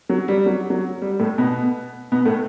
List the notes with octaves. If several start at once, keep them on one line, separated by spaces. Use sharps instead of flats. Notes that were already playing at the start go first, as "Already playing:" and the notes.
F#3
G3
F#3
F#3
G3
A2 A3
B2 B3
B2 B3
A2 A3